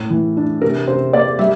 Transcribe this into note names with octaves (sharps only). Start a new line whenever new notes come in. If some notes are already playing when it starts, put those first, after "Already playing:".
Already playing: A2
E3
D4
C3 A#4
C3 C5
A#3 D5
G3 E5